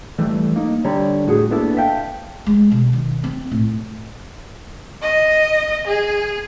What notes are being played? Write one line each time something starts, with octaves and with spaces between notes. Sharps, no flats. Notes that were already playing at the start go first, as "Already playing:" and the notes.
E3 G3 A3
A#3 D#4
D3 G3 C#5 A#5
A2 F#4 G#4
A#3 B3 D4 E4 A4
E5 F5 G5 A5
G#3
B2
D#3
C4
A2
D#5
G#4